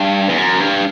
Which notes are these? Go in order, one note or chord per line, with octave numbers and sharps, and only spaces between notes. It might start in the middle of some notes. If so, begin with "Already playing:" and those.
Already playing: G2
E2
F#2
G2